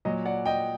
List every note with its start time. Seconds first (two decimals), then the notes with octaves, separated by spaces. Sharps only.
0.05 A#2 F#3 D#5
0.25 D5 F#5
0.46 D#5 G5